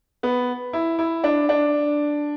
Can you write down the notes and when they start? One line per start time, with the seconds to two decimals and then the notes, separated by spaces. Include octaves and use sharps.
0.23 B3
0.73 E4
0.99 E4
1.24 D4
1.49 D4